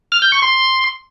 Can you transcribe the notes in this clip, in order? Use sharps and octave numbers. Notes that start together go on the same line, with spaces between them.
F6
G6
C#6
C6